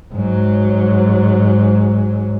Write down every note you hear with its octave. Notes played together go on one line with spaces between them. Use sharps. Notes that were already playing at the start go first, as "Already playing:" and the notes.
G#2 F#3